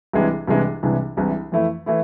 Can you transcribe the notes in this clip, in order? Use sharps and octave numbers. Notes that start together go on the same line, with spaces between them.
C2 C3 E3 G#3 D4
C2 C3 E3 G#3 D4
C2 C3 E3 G#3 D4
C2 C3 E3 G#3 D4
F2 E3 A3 E4
E3 A3 E4